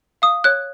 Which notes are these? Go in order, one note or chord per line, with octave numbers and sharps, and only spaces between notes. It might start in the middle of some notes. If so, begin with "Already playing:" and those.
F5 D#6
C#5 F#6